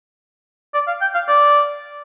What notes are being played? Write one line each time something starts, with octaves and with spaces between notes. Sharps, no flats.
D5
F5
G5
F5
D5